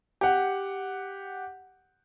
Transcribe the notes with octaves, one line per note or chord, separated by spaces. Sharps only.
G4 F#5